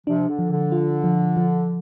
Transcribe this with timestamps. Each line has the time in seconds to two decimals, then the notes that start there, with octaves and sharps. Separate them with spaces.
0.07 C3 F3 D4
0.28 D3
0.39 F3
0.51 D3
0.72 F4
1.04 F3
1.37 F3